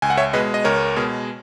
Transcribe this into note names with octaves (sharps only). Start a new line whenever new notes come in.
C#2 G#5
F#5
C#5 E5
B2 G#3 B4 D#5
D#5
C#2 A#4 C#5
B2 G#3